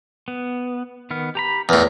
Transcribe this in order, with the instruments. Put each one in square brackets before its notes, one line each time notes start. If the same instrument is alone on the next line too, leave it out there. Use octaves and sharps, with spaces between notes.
[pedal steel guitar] B3
D#3 B3 F6
G4 A#5 B5
[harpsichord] E2 A2 [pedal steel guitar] A#4